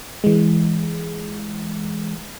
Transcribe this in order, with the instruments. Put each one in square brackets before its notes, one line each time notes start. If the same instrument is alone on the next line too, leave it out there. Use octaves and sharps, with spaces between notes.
[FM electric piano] E3 G#3